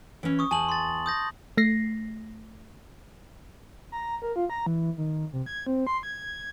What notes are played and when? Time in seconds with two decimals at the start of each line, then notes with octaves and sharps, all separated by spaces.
0.23 E3 C#4
0.39 C#6 D#6
0.51 E2 G#5 A5 F#7
0.69 C6 A6
1.06 D#6 G6 A#6
1.58 A3 A#6 C7
3.92 A#5
4.22 A#4
4.36 F4
4.50 A#5
4.66 E3
4.98 D#3
5.33 C3
5.46 G#6
5.67 C4
5.87 C6
6.03 G#6